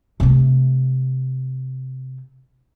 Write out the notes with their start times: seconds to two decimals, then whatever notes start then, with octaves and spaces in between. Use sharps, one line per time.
0.20 C3 A3